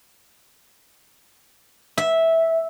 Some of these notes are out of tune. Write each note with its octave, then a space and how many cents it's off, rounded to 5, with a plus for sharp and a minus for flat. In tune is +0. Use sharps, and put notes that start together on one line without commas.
E5 -10